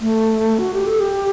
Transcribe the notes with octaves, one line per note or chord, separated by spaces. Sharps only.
A3
F#4
G4
A4
G4